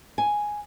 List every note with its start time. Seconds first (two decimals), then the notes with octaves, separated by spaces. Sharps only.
0.18 G#5